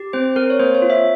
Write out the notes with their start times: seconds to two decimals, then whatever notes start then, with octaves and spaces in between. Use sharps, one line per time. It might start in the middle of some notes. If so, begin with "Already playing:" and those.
Already playing: G4
0.13 C4 C5
0.36 C4 A#4
0.50 C#5
0.59 A#3 C5
0.75 C#5
0.82 F4
0.90 E5